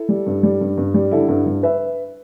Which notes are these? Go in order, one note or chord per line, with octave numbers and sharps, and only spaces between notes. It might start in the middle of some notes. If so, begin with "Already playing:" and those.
Already playing: E4 A4
G3
G2
G3
G2
G2
G3
D3 E4 A4
G2
G2
B4 E5